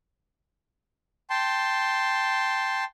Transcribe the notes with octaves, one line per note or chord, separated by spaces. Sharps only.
G5 A5 C6